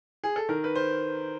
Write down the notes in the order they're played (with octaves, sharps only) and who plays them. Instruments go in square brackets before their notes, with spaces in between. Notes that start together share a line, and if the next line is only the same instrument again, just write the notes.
[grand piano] G#4
A4
D#3 A#4
B4
C5